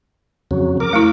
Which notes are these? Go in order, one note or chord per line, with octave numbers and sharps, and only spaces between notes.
F2 C#3 F#3
A#4 D6
A3 E4